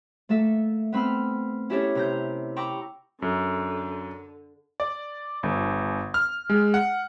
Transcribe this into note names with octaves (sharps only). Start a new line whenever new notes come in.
A3 A#3 A4 E5
B3 C4 B5 E6 F6
C#4 E4 G4 A4 A#4 C#5
C3 A#5 G6
G5 A#5 B5 C#6 D6 E6
F#2 D3
D5
G1
F6
G#3
F#5